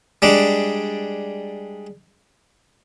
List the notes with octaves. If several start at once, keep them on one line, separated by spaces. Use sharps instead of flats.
G3 G#3 D4